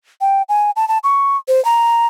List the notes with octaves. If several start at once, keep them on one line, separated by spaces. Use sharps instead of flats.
G5
G#5
A5
A5
C#6
C5
A#5